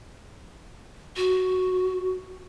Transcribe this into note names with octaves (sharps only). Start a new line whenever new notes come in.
F#4